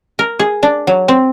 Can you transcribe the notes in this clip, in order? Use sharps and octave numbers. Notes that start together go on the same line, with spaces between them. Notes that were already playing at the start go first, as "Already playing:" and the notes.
A#4
G#4
D4
F#3
C4